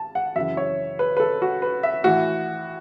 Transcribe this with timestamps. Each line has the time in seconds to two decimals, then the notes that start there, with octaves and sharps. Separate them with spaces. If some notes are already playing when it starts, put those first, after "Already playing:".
Already playing: A5
0.15 F#5
0.36 F#2 C#3 E3 E5
0.57 C#5
0.99 B4
1.17 B4
1.20 A4
1.42 F#4
1.62 B4
1.83 E5
2.04 A2 E3 F#4